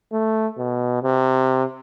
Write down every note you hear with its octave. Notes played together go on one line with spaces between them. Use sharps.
A3
B2
C3